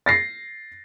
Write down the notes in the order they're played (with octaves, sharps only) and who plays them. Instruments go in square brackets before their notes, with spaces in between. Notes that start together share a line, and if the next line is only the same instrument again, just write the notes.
[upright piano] A6 A#6 C7